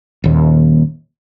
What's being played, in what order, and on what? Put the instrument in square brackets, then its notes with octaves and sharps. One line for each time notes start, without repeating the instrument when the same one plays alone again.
[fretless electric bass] D#1 D#2